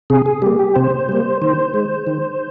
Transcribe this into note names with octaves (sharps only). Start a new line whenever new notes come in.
C3 G#4
G#4
G3 A#3 G4
G4
C3 C5
G3 A#3
D#3 C5
G#3
D#3